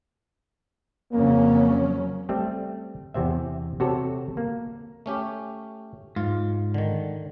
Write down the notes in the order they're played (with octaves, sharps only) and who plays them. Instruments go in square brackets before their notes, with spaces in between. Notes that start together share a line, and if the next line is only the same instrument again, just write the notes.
[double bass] F2 C#3 [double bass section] F#3 C#4 [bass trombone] A#3
[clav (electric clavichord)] G3 A3 C4
E2 C3 C4 E5
C3 F#4 A4 C5 C#5
A#3
A3 C#4 G4
[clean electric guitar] G#2 [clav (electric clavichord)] F4
[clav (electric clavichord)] D3 D#3